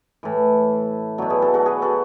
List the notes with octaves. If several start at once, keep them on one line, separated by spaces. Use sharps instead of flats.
A2 E3
B2 F#3 D4 F#4
E4 G#4
F#4 A4
F#4 A4
G#4 B4
F#4 A4